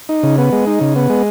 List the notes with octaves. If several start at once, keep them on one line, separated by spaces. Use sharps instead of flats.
D#4
C#3
B3
G#3
D#4
C#3
B3
G#3